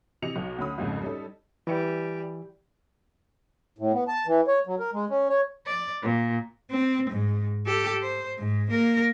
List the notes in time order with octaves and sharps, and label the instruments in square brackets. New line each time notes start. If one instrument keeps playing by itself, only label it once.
[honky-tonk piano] C3 E3 D#5 C#7 F7
B1 B2
D2 C#4 B5 D#6
C2 F2 G#2 C#3
G3 C#4 D#4 A4
[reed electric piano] E3 [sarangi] G3
[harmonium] A2
B3
A5
E3
C#5
F#3
A#4
G#3
C#4
C#5
[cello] D5
A#2
C4
G#2
G4 A4
C5
G#2
A#3 A#4